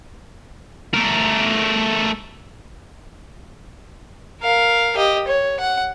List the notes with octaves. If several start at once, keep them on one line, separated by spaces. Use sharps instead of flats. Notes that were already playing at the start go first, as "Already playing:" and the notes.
A3 A#4
A#4 F5
G4 D#5
C#5
F#5